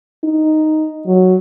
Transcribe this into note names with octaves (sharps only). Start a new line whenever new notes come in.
D#4
F#3